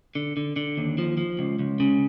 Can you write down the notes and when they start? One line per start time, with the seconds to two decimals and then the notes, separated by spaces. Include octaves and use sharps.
0.15 D3
0.37 D3
0.56 D3
0.77 D#2
0.98 F3
1.17 F3
1.39 C#2
1.59 C#2
1.80 C#3